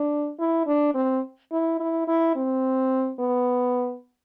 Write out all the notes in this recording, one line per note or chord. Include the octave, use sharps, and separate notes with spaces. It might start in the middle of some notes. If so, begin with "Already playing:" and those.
Already playing: D4
E4
D4
C4
E4
E4
E4
C4
B3